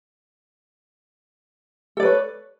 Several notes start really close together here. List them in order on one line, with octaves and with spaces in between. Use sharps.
A4 D5 B4 C#5